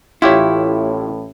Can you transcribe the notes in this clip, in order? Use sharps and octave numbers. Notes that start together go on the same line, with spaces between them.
A1 A2 E4 F4 G4 C#5